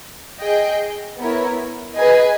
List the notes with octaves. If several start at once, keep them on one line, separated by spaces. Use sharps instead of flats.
G#4 D#5 G5
B3 E4 A#4 C#5
G#4 B4 D#5 G#5